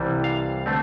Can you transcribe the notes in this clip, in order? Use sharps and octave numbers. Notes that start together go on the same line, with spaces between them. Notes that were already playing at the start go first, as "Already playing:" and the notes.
Already playing: C2 C3 E3 G3
F5
D3 A3 C4